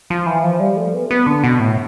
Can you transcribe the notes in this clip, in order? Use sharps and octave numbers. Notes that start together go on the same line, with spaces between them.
F3
E3
F3
G3
A3
B3
B3
D3
B2
A2